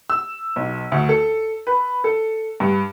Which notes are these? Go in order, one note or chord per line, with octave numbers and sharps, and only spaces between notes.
E6
B1
D2
A4
B4
A4
G2